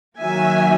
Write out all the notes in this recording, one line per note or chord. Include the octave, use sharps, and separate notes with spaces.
D#3 F#3 A#3 E5 G#5